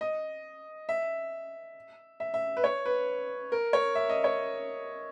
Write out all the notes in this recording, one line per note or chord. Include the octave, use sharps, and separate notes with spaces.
D#5
E5
E5
E5
B4
C#5
B4
A#4
C#5
E5
D#5
C#5